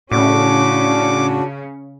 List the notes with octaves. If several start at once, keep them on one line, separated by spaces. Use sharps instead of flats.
A2 C#3 C#4 D4 F#4 D6